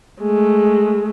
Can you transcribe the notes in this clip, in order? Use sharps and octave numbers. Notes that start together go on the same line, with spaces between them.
G#3 A3